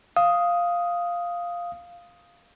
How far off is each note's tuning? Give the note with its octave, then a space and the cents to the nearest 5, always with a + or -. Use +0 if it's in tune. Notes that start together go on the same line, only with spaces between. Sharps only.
F5 +0 D#6 +5